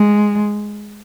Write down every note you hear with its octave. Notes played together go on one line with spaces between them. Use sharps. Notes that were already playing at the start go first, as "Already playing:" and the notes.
Already playing: G#3